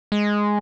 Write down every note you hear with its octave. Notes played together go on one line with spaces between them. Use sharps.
G#3